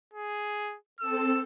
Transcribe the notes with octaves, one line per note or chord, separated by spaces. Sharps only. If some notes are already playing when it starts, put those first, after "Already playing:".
G#4
C4 A4 E6